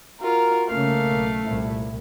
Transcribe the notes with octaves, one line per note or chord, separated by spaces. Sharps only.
F4 F#4 A#4
C2 C#3 A3 A#3 C#4 F5
B1
C2 A#2 E4